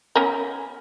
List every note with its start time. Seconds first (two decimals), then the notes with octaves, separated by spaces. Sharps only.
0.16 B3 C#4 A#4